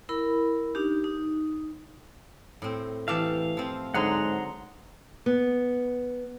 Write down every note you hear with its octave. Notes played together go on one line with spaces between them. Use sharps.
E4 A#4 B5
D4 D#4 G4
D#4
A2 C4
E3 A3 G4 A4 F5
F3 C4
G#2 D3 F#3 G#4 F#5 A#5 C6
B3